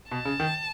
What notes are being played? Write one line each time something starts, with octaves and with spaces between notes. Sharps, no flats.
B2 A5
C#3
D#3